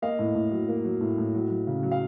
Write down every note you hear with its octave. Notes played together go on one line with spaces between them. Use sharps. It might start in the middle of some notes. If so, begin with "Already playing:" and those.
A#3 D#5 F5
A2
A2
F#3
A#3
F#3
A2
A2
F#3
F#3
C#3
F#3
F5